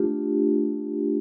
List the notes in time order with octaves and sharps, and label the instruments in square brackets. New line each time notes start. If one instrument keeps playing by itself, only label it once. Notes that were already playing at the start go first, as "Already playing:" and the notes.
Already playing: [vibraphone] A3 D4 F4 G4